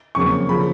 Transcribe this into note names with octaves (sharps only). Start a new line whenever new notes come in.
F2 C#3 F#3 A#3 C#6
C#3 F3 B5